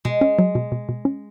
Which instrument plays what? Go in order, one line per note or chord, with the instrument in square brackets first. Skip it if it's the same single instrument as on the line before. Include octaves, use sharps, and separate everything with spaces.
[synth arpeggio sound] B2 [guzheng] G#3
[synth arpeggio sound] C#4
F#3
B2
B2
B2
C#4